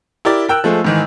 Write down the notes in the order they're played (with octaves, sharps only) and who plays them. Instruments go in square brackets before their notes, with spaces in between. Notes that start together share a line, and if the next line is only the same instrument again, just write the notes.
[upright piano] E4 G4 A#4 D5
A#4 G5 E6 F#6
F3 G#3 A3
G#2 D#3 E3